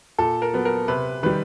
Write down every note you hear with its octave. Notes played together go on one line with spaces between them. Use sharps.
A#2 A4
A#4
F#3 B3
A#4
C3 B4
D#3 G3 B4